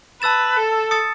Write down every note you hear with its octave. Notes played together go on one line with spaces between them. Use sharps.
B4 A5 E6 A6 E7
A4
D#6 A6 C#7